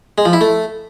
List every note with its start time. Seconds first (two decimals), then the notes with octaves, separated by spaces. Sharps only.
0.18 G#3
0.25 F3
0.33 E4
0.41 A3